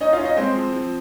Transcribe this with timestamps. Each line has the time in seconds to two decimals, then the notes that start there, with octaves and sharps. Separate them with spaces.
0.01 C#4 D#4 D#5
0.13 F4 F5
0.19 C#4
0.24 D#4 D#5
0.37 G#3 C4 C5
0.54 F3
0.73 F3